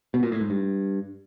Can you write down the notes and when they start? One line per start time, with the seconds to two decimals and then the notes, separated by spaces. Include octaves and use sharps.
0.14 B2
0.23 A#2
0.32 A2
0.41 G#2
0.50 G2